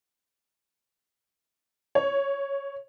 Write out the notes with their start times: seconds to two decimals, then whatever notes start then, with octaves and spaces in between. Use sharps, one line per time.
1.95 C#5